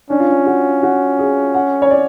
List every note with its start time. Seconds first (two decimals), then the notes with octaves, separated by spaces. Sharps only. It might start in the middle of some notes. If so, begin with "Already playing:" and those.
0.10 C#4 D4
0.20 F4
0.28 D4
0.46 F#4
0.83 F#4
1.19 G#4
1.54 F#5
1.82 C#5
1.90 D5